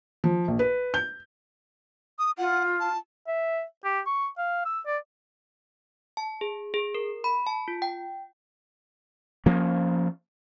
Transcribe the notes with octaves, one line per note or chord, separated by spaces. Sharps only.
F3
A#1
B4
G6
D#6
F4 F#5
A5
E5
G4
C#6
F5
E6
D5
A5
G#4
G#4
A#4
B5
A5
F4
G5
F3 A#3 C#4